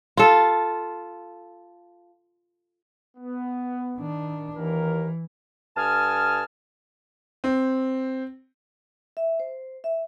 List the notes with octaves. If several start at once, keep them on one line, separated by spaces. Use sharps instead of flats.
F4 A4
B3
D#3 D4
D#2 E3 A#4
G2 A4 G#5 A5 D#6 F6
C4
E5
C5
E5